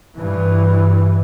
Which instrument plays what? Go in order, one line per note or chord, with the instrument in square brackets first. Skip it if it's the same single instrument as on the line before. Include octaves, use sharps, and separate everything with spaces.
[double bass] G2 E3